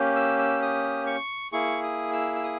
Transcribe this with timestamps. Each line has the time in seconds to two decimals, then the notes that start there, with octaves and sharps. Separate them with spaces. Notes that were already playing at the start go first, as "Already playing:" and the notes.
Already playing: A#3 C#4 G4
0.16 E6
0.39 E6
0.62 D#6
1.06 C#6
1.52 A#3 E4 G#4 C#6
1.83 D#6
2.13 E6
2.35 E6
2.44 D#6